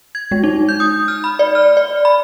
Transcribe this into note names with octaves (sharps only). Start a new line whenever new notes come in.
G#6
G#3
D#4
G6
D#6
F6
B5
D5
F6
D5
B5